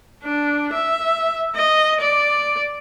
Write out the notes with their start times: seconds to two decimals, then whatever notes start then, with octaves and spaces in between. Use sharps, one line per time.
0.24 D4
0.73 E5
1.56 D#5
2.00 D5